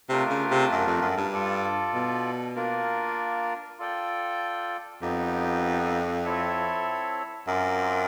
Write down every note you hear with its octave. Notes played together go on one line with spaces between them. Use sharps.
C3 A3 D4 F4 A#4
C#3
C3
F#2
F2
F#2
G2
F4 A4 D5
B2
A#3 D4 F4 A#4 D5
F4 A4 D5 G5
F2 B3 D#4 G4
C4 E4 A4 C#5 E5
F#2 C4 F4 A#4 D5